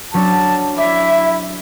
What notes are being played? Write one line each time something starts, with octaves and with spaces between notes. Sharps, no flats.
F#3 C#4 D4 A5
E4 D5 E5